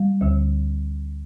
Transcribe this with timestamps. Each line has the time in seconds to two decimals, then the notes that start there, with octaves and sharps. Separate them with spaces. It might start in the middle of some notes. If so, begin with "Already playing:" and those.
Already playing: G3
0.21 D2 D3